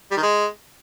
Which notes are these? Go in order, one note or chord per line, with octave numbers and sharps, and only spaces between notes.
G3
D#3
G#3